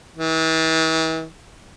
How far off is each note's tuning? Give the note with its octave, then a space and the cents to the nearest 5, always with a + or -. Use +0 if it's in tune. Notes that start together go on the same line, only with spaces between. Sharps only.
E3 -40